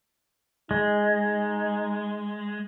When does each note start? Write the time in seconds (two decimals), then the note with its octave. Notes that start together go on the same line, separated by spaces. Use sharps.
0.71 G#3 D#4